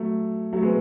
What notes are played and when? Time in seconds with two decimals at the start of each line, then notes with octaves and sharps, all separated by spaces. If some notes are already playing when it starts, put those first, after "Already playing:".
Already playing: F#3 A3
0.53 F#3 A3
0.63 G#3 B3